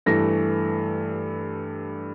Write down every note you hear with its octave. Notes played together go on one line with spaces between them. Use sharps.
G2 E3 A3 A#6